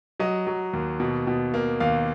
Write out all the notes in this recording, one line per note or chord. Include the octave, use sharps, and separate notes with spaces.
F#3 D#5
F#3
D#2
B2
B2
A#3
D#2 F5